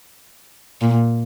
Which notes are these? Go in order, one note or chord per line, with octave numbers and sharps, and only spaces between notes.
A#2